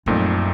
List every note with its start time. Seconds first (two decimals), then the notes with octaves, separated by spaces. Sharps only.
0.06 A#1 F#2 A#2 A3 C4 D#4